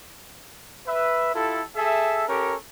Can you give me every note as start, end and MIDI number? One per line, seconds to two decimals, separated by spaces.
0.87 1.32 71
0.87 1.32 76
1.34 1.63 64
1.34 1.63 65
1.34 1.63 67
1.34 1.63 69
1.76 2.27 68
1.76 2.27 69
1.76 2.27 76
2.28 2.55 61
2.28 2.55 67
2.28 2.55 69
2.28 2.55 70
2.28 2.55 73